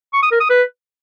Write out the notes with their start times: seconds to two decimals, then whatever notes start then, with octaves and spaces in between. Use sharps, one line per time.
0.13 C#6
0.22 D#6
0.31 A#4
0.40 D#6
0.49 B4